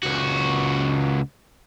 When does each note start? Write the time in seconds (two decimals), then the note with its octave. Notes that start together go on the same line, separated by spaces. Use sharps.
0.03 C#2 F#4